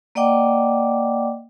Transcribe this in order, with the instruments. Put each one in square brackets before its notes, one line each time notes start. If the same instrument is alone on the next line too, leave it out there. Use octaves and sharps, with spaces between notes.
[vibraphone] A#3 D5 D#5 F#5 G5 D6